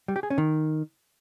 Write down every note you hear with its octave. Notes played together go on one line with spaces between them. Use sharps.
G3
G4
G#4
C#4
D#3